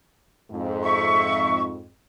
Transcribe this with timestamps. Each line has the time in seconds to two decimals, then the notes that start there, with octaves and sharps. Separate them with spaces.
0.51 F2 G#2
0.82 E5 C#6